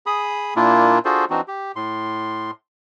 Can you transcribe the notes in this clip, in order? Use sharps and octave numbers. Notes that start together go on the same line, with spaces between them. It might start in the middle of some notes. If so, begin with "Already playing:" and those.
G#4 B5 D#6
A#2 A#3 D4 E4 F4
D4 F4 F#4 G#4 A4 C5
E3 C4 D4 D#4 F#4
G4
A2 C6